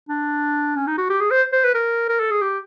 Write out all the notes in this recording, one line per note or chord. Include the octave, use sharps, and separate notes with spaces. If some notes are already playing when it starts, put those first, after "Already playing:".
D4
C#4
D#4
F#4
G4
G#4
C5
C5
B4
A#4
A#4
A4
G#4
G4